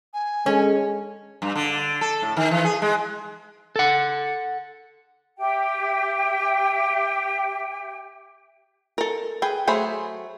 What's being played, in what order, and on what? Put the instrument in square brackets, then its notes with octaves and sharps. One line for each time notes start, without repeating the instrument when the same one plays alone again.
[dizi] G#5
[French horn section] G#3 A4 [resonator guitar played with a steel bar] C#4
[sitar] G2
D3
A4
A2
D#3
E3
G#4
G#3
[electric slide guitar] A4 F#5
[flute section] G4 E5 G5
[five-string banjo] A4 A#4
G#4 B4 G5
F#3 A3 G#4 C5 B5